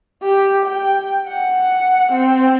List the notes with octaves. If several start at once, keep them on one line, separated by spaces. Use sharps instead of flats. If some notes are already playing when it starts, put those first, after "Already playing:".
G4
G5
F#5
C4